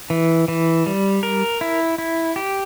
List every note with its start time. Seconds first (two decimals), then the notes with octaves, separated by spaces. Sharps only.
0.10 E3
0.48 E3
0.86 G3
1.23 A#4
1.61 E4
1.98 E4
2.36 G4